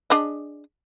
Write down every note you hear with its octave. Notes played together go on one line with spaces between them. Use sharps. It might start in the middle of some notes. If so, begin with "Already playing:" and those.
D4 G#4 D#5